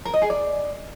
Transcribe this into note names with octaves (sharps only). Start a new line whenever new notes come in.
A#4
D#5
G#4
D5